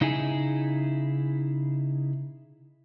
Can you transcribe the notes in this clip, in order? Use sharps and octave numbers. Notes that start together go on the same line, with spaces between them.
C#3 D#4 E4 G#4 G#5